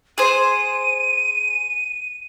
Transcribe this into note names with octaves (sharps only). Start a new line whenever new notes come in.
G#4 C5 D#7